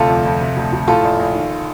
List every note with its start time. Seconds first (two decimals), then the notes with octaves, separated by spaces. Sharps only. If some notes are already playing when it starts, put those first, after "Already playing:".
Already playing: D2 C3 F4 A4
0.09 F2
0.25 F2
0.41 C3
0.56 D2
0.73 D2
0.88 A2 F4 A4
1.03 A#1
1.19 A#1
1.34 D#3